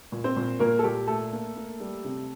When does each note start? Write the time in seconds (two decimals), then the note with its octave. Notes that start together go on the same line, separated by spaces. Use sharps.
0.12 A#2
0.24 C4 C5
0.36 A#2
0.59 A#2 A#3 A#4
0.79 A4
0.84 A#2 G4
1.08 A3 A4
1.33 A#3
1.56 A#3
1.80 G3
2.05 C3